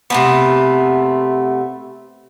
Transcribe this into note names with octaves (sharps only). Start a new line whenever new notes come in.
C3 A3 B3